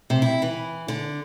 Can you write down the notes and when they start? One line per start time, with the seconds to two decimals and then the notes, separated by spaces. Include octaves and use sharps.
0.10 C3
0.22 E4
0.42 E3
0.88 D3